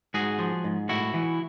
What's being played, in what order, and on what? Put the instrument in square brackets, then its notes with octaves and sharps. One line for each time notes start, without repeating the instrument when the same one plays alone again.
[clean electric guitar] G#2 F#4 G#4
F3
G#2
A2 E4 F#4
E3